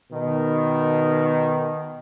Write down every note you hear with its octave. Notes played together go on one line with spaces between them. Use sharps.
B2 D#3